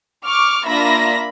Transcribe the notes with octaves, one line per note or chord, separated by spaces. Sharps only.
C#6 D6 F6
A#3 D4 F4 E5 B5 A#6